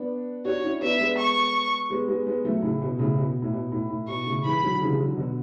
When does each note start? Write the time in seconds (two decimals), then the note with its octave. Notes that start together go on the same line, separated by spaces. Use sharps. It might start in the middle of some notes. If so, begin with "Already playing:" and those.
Already playing: B3 D4
0.45 D4 F#4 C#5
0.63 C#4 E4
0.81 B3 D4 E5
1.00 G#3 B3
1.18 C#6
1.90 G#3 B3
2.08 G#3 B3
2.27 G#3 B3
2.45 F#3 A3
2.62 A2 C#3
2.82 B2
2.99 A2 C#3
3.18 B2
3.42 A2
3.53 B2
3.72 A2
3.90 A2
4.08 B2 C#6
4.26 A2 C#3
4.44 E3 G#3 B5
4.63 D3 F#3
4.81 C#3 E3
4.90 G#3
4.99 D3 F#3
5.17 B2 D3